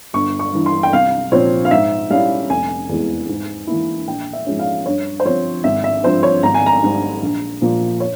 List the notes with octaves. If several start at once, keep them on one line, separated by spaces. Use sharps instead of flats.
G1 C#6
C#6
G2 E3
C6
G5
C2 F5
A#2 F3 C4 C#5
F5
G#2 E5
G3 C#4 E4 F5
F1 G#5
E2 E3 G#3
G#2
E3 A#3 E4
A#1 G5
E5
G#2 F3 G#3 C#4
F5
G2 C#5
C5
F3 C4 C#5
G#1 E5
E5
G2 F3 C4 C5
C#5
G#1 A#5
G#5
A#5
G#2 G3
A#1
A#2 F3 A#3
C#5